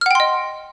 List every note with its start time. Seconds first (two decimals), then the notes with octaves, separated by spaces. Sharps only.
0.01 F6
0.06 F#5
0.11 G5
0.15 C6
0.20 D#5